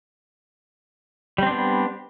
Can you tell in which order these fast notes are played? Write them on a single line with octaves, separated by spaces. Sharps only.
G3 C4 D4 B3